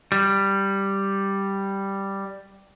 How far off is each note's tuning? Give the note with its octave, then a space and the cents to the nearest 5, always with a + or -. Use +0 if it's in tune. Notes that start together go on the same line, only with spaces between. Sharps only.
G3 +0